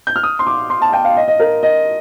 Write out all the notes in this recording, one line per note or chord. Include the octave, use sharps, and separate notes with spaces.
G6
F6
D#6
C6
D6
C6
A5
G5
F5
D#5
D#5
A#4
D#5